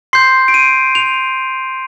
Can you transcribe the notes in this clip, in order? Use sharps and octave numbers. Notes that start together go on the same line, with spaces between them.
C6 G6 C7
D7
D#7
F7